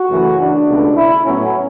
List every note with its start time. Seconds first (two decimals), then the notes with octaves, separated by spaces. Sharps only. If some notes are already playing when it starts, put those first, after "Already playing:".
Already playing: F#4
0.10 F#2 C#3 E3 A3
0.40 D4
0.67 C#2 B2 A3
0.96 E4
1.25 A2 F#3 B3 C#4